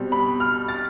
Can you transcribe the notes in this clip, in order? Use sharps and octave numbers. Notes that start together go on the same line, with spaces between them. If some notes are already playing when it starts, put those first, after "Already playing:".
Already playing: B2 G3 C4
B5
F6
A6